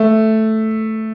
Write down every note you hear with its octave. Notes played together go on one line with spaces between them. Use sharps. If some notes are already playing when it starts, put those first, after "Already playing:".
Already playing: A3